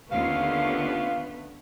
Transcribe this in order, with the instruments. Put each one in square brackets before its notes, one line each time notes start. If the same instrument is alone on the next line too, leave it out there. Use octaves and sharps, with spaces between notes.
[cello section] D#2 C#4 F4 [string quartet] D3 A3 B3 [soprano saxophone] F5